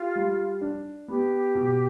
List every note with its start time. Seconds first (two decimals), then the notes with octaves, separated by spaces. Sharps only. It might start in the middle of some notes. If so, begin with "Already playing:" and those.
Already playing: F4 G4
0.16 G3
0.61 D4
1.08 B3 G4
1.55 B2